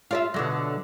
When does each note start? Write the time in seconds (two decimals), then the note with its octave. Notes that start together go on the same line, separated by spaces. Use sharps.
0.11 F4 D5 E5
0.34 B2 D3 F#3